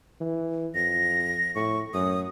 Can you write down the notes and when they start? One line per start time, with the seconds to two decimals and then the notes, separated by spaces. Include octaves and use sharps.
0.20 E3
0.75 F2 A#6
1.55 A2 C#6
1.94 F#2 D#6